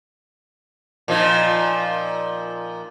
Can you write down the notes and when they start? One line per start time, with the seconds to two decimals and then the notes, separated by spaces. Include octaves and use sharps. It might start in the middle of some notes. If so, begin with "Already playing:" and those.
1.08 A#2 F3 D#4